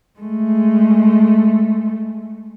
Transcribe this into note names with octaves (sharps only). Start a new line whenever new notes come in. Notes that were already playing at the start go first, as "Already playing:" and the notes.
G#3 A3